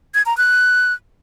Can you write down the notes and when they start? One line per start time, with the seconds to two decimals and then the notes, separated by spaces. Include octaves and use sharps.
0.14 G#6
0.26 A#5
0.37 F#6